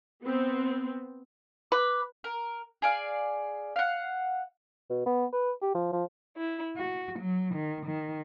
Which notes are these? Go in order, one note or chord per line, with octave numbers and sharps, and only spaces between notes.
B3 C4
B4 D6
A#4
G#4 D5 F5
F5 F#5
B2
B3
B4
G4
F3
F3
E4
F#4
F#3
D#3
D#3